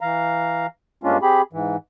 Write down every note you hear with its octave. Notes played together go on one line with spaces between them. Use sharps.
E3 F5 A#5
G2 G#3 A#3 C#4 D4 F4
C4 G4 G#4 B5
G#2 E3